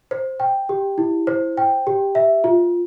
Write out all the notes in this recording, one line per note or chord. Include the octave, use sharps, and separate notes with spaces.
C5
G5
G4
E4
C5
G5
G4
E5
F4